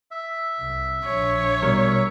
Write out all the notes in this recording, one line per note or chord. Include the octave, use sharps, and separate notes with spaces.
E5
C2
A#1 C#5
B2 G3 A#4